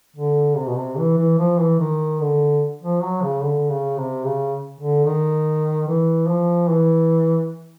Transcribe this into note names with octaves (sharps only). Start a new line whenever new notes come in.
D3
C3
B2
C3
E3
E3
F3
E3
D#3
D3
F3
F#3
C#3
D3
C#3
C3
C#3
D3
D#3
E3
F3
E3